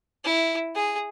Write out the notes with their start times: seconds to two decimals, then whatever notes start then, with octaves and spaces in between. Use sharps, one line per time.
0.24 E4
0.75 G#4